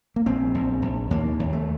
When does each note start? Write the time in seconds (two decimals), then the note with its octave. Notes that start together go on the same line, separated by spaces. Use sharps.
0.16 A#3
0.26 A#1 C4
0.55 A#1
0.82 A#1
1.11 D#2 A#3
1.40 D#2
1.53 A3